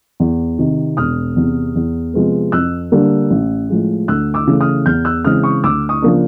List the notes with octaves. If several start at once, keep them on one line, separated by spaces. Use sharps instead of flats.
E2
C3 D#3
E1 D#6 F6
E2 C3
E2
C3 F3 G#3 B3
F2 E6 F#6
D3 G3 A#3 D4
A1
A2 F3 G#3
D2 E6 F#6
D6 E6
C#3 E3 A3
D#6 F6
E2 F6 G6
E6 F#6
C#3 E3 G#3 C4 D#6 F6
C#6 D#6
D2 D6 E6
C#6 D#6
C#3 F3 A#3 D4